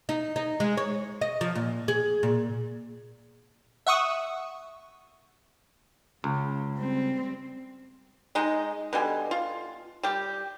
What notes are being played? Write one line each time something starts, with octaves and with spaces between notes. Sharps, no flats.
D#4
D#4
G#3
C#5
D#5
F3
A#2
G#4
A#2
E5 F#5 C#6 D#6
C#2 C#3
G3 C4
G#3 D#4 D#5
B2 D3 G3 G#5
F4
G3 G4